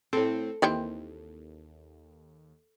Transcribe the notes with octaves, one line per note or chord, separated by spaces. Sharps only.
A2 C4 A4
D#2 D#3 E3 C4